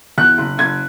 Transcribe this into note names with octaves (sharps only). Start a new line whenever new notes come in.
E2 F#6
F#1
F#1 G#6